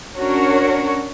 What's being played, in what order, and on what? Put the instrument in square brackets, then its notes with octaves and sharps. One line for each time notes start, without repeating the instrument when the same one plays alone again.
[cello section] C#4 D4 F#4 A#4 C#5